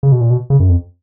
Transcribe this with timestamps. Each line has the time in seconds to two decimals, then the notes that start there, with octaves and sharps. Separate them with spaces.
0.03 C#3
0.12 B2
0.21 A#2
0.30 B2
0.50 C#3
0.60 F#2
0.69 F2